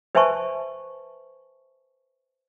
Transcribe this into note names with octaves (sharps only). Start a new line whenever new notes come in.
B4 C5 E5 G#5 A5 C#6